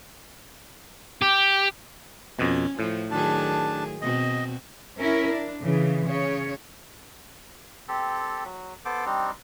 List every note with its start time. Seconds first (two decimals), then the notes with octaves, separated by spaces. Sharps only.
1.22 G4
2.39 F2 B2 C#4
2.79 A2 F3
3.11 D#3 F#3 D4 G#4 A5
4.02 B2 C4 F#4 D#5
5.00 C#4 E4 A#4
5.31 D4
5.62 C#3 E3
6.06 C#3 C#5
7.88 C4 G4 A4
8.45 F#3
8.85 B3 A4 C5 D6
9.06 G3 C4 D4 D#4